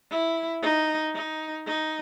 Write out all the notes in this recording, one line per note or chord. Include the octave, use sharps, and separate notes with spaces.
E4
D#4
D#4
D#4